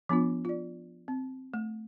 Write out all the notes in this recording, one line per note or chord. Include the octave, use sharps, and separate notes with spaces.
F3 B3 D4 F4
F4 D5
C4
A3